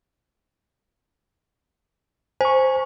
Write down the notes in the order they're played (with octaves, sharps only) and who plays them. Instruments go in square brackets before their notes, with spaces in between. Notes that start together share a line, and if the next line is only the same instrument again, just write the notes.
[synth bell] C5 [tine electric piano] G#5 C#6